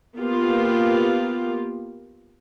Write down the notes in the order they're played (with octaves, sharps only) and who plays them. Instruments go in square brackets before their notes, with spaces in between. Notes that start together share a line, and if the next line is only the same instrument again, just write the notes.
[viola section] A#3 B3 F4 G4